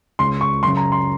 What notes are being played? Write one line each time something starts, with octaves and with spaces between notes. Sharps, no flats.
C#2 C#3 C6
C#6
F#2 C#3 C6
A#5
C6